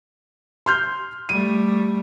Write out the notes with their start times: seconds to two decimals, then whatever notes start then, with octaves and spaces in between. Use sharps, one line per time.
0.66 C6 F6 G6
1.29 G3 A3 D#7